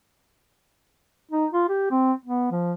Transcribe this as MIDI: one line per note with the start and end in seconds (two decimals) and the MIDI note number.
1.31 1.46 63
1.53 1.65 65
1.69 1.88 67
1.91 2.13 60
2.26 2.48 59
2.51 2.73 53